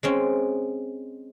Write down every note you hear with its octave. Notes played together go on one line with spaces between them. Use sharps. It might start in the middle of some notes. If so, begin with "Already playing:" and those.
G#3 C4 C#4